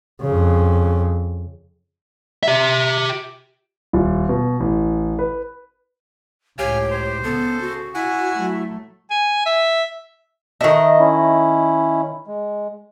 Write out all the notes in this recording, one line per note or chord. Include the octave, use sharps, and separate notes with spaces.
F2 C#3
G4 E5
D#1
B2
A1
B4
C#2 A2 G4 C#5 F5 G#5
C5
C#3 B3 A4
F#4
E4 F#5 G#5
F#3 A3
G#5
E5
D#3 F#4 A4 D#5 E5
C#4 E4
G#3